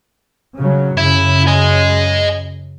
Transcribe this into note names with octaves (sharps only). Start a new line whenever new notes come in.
C#3 F#3
F#2 C#3 E4
D#5 G#5